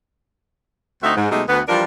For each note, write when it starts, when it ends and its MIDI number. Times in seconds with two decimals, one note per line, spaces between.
1.03 1.14 38
1.03 1.14 57
1.03 1.14 60
1.03 1.14 63
1.03 1.14 66
1.03 1.14 76
1.17 1.30 44
1.31 1.43 47
1.31 1.43 54
1.31 1.43 56
1.31 1.43 57
1.31 1.43 63
1.31 1.43 67
1.48 1.61 38
1.48 1.61 59
1.68 1.84 52
1.68 1.84 53
1.68 1.84 55
1.68 1.84 62
1.68 1.84 65
1.68 1.84 70